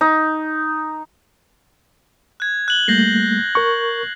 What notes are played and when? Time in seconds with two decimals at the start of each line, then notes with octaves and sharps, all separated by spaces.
0.01 D#4
2.40 F#6 G#6
2.68 F#6 F#7 G7
2.88 G3 A3 A#3 G6 A#6 C7
3.55 A#4 C#6